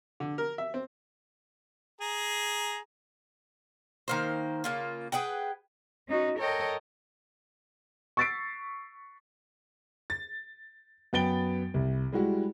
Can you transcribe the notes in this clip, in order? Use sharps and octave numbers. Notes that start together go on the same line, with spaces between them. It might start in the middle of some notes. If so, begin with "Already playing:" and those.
D3
A#4
E5
C4
G#4 A#5
D#3 A#3 C5
C#3 A#3 F4
G#4 B4 F#5 G5
C#4 D#4 F#4
A4 A#4 C#5 D#5 G5
C#6 E6 A6 B6 C7 D7
A6
F#2 B3 G5 A6 D7 G7
C2
G3 G#3 E4 F#4